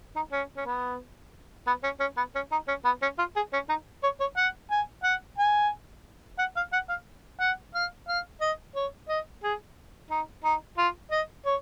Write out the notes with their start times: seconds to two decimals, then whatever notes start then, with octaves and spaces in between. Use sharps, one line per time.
0.16 D#4
0.32 C#4
0.57 C#4
0.66 B3
1.67 B3
1.84 C#4
2.00 C#4
2.17 B3
2.35 C#4
2.52 D#4
2.68 C#4
2.85 B3
3.02 C#4
3.18 F4
3.36 G#4
3.53 C#4
3.69 D#4
4.03 C#5
4.20 C#5
4.37 F#5
4.71 G#5
5.04 F#5
5.38 G#5
6.39 F#5
6.57 F5
6.73 F#5
6.89 F5
7.40 F#5
7.75 F5
8.09 F5
8.41 D#5
8.76 C#5
9.09 D#5
9.43 G#4
10.11 D#4
10.44 D#4
10.77 F4
11.11 D#5
11.45 C#5